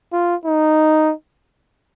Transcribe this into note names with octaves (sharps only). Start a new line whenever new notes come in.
F4
D#4